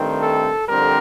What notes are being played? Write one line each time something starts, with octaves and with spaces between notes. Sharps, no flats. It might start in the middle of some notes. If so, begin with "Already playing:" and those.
Already playing: G2 D#3 A3 C4
A4
F2 D3 G3 C4 A#4